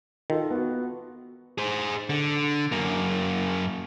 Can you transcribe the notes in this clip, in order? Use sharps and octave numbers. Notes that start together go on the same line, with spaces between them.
D#3 F4 A4
B3 F#4
G#4 C5
D3
F#2 A#3